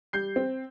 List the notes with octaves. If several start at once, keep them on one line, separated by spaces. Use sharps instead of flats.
G3 G6 C7
C4